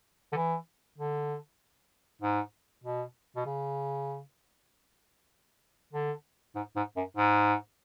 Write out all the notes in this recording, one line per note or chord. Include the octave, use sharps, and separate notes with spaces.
D3
E3
D3
G#2
B2
B2
C#3
D3
G#2
G#2
F#2
G#2